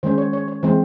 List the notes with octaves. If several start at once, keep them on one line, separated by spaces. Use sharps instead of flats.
D#3 G#3 C#4 C5
C#5
C#5
C#5
E3 G#3 C4 C5